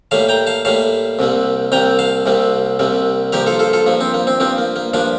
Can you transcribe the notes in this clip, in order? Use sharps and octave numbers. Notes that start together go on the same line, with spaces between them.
A2 G3 A#3 F5 A5
G5 A#5
F5 A5
A2 G3 A#3 F5 A5
C2 C3 G3 A#3
C2 C3 G3 A#3 G5 A#5
F5 A5
C2 C3 G3 A#3
C2 C3 G3 A#3
G2 F3 A#3 G4 A#4
F4 A4
F4 A4
F4 A4
G2 F3 A#3
C4
A#3
C4
G2 F3 A#3 C4
A#3
A#3
G2 F3 A#3 D4